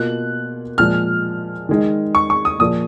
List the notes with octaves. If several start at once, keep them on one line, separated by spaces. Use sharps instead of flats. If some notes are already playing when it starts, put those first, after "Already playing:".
Already playing: B2 A#3 F4 F#6
A#2 F3 G#3 F6
D#3 G#3 D#4
C#6
C#6
D#6
A#2 F3 A#3 D#6